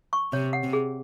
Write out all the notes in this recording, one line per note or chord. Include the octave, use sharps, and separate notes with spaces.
C#6
C3 C#5
F#5
C3
G#4